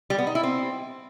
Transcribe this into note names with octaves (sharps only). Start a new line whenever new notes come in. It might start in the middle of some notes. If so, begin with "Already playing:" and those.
G3
B3
D#4
E4
C4